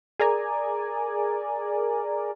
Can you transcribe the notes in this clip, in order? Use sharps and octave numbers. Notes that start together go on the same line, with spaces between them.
G#4 A#4 D5 G#5 A#5